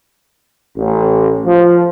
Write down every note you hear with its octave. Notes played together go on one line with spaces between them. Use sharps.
A1
F3